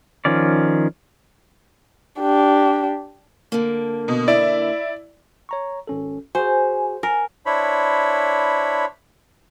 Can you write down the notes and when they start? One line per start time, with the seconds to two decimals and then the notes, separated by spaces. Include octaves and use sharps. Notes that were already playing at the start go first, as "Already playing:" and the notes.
0.25 D#3 F3 C#4 D5
2.20 D4 G4
3.52 D3 A#3
4.08 B2
4.28 E4 D5
5.49 C#5 A#5 C#6
5.87 G#1 C#4 A4
6.35 F#4 G#4 C5 G#5
7.03 A#4 G#5
7.46 D4 E4 C5 C#5 B5